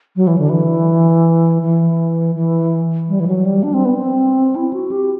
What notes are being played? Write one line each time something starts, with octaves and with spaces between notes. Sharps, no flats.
F#3
E3
D3
E3
E3
E3
G3
E3
F#3
G3
D4
C4
B3
C4
E4
F#4
G4